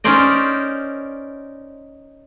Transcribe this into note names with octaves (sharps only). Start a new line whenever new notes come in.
C#4 D#4 A#4 C5 D5 D#5